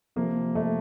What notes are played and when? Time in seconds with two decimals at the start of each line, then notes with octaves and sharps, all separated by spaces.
0.16 C3 F3 A#3
0.55 A3